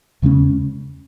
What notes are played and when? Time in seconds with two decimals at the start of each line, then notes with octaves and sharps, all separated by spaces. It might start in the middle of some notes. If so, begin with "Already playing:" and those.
0.22 E2 C#3 G#3 C#4